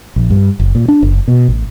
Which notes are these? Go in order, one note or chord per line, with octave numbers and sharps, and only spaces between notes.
A#1
G2
F#1
A#2
D4
F#1
B2
A1